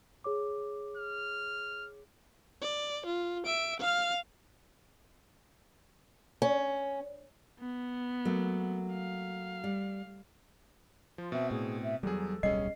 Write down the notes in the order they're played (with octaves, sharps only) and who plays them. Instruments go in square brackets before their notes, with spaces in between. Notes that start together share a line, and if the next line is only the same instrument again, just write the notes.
[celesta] G#4 C#5 D6
[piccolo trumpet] F6
[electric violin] D5
F4
E5 D7
F5 F6
[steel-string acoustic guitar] C#4
[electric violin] B3
[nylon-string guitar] F#3 A3 A#3
[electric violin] F5
[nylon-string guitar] G3
[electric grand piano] F3 [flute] F4
[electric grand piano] B2 C4 [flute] E5
[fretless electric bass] A2 [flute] G#4
[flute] E5
[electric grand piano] E2 G#4 [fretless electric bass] F#3 G3 [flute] A4
[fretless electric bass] D1 B1 G3 [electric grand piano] C#4 G#4 C7 [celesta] D#5